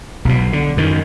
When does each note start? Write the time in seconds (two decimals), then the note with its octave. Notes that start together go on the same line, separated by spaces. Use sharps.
0.25 B1 B2
0.53 D3
0.77 F#2 D#3